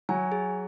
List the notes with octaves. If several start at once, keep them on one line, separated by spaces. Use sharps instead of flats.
F#3 G#5
G#4